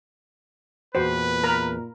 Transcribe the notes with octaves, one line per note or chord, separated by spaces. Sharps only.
E2 A#2 F#4 B4 C5 F#5
A#4 A#5 B5